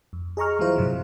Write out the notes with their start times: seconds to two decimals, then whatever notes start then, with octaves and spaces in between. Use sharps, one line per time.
0.13 F2
0.37 G#4 D#5 A#5 C#6 F6
0.59 E3 F#3 G3 E4 F4 C5
0.76 G2 C3 F3 F#3